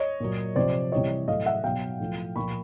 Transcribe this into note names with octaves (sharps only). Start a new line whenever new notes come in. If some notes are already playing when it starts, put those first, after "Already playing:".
Already playing: C#5 D#5
A#2 F#3
C3 F3 C5 D5
C3 E3 G3 C#5 D#5
A2 F#3 D#5 F5
E5 F#5
B2 F#3 F5 G5
A2 F3
A#2 F3 B5 C#6